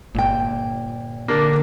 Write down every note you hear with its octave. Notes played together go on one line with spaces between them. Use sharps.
G1 A#2 G5
D3 A#3 D4